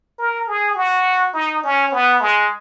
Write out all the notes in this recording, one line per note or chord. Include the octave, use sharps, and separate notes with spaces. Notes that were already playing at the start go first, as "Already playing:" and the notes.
A#4
G#4
F#4
D#4
C#4
B3
G#3